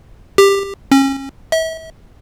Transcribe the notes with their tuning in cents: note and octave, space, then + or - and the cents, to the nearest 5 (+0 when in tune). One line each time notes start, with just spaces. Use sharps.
G4 +15
C#4 -30
E5 -35